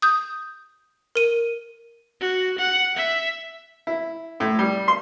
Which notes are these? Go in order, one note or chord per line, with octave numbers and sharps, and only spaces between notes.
D#6 G6
A#4 D#7
F#4
F#5
E5
E4
A2
G3
C6